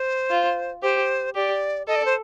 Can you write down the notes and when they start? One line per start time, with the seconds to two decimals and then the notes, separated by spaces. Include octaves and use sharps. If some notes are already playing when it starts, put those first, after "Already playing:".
Already playing: C5
0.30 F4
0.83 G4 C5
1.35 G4 D5
1.88 A4 D#5
1.96 D5
2.06 C5